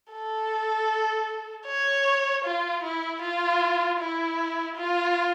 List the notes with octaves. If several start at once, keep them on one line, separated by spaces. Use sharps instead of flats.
A4
C#5
F4
E4
F4
E4
F4